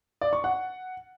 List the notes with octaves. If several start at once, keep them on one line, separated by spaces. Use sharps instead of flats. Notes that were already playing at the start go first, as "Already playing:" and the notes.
D5
C#6
F#5